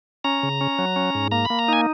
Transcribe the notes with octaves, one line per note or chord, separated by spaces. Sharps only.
C#4 A#5
C#3
C#4
F#3
C#4
G#2
A#3 A#5
B5
A#3
A#5
D#4 G#5